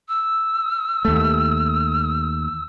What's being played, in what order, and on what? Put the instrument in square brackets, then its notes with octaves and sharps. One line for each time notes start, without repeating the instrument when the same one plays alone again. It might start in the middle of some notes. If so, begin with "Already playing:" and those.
[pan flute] E6
[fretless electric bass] D#2 A3